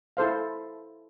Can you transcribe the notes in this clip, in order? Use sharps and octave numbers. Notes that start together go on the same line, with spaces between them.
E4 A4 C5 F5